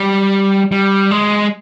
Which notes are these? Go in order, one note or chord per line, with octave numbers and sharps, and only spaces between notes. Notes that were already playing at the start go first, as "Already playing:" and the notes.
Already playing: G3
G3
G#3